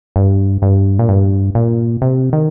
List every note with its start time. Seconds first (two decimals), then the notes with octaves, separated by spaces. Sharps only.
0.16 G2
0.62 G2
0.99 A#2
1.09 G2
1.55 A#2
2.02 C3
2.33 D#3